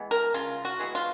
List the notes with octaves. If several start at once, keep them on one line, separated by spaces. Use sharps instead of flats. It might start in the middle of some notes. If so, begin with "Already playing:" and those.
Already playing: E3 G#3 B3
A#4
C#3 F4
F#4
E3 G#3 B3
F4